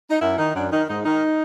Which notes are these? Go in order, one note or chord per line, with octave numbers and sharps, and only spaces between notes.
D#4
F#2 E4
D#3 D#4
F#2 D4
D#3 D#4
G#2 D#4
D#3 D#4